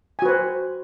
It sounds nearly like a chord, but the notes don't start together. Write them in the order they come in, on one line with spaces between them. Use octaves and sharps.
G#5 F#4 B4 C5